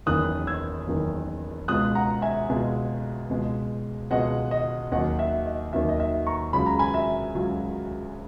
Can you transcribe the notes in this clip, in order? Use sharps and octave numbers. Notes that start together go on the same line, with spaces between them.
F#1 E2 D#3 D#6 F#6
E6 G#6
F#1 E2 D#3
C#2 B2 G#3 D#6 F#6
F#5 A#5
E5 G#5
C#2 B2 G#3
C#2 B2 G#3
C#2 B2 G#3 D#5 F#5
D#5
D#2 D#3 F#3 D#5 F#5
E5
D#5
D#2 D#3 F#3 E5
D#5
E5
A#5 C#6
C#2 C#3 F#3 B5
A#5
G#5 B5
E5
C#2 C#3 F#3